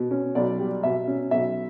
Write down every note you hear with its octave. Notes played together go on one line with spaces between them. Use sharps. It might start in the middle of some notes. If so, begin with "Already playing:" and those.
Already playing: B2
C#4
B1 D5
G3
B2 E5
C#4
B1 E5